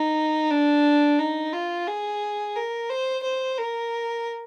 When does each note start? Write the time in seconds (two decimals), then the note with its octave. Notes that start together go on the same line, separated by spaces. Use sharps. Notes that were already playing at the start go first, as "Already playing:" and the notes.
Already playing: D#4
0.50 D4
1.19 D#4
1.53 F4
1.87 G#4
2.55 A#4
2.90 C5
3.23 C5
3.58 A#4